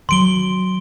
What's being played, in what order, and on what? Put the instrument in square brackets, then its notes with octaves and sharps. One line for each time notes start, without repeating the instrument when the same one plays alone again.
[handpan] D#3 F#3 [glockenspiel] C6 D7 G7